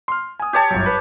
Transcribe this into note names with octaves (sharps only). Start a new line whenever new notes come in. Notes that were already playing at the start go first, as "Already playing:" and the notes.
C6 F6
G#5 D#6
G4 C#5 A5
G1 F#2
B4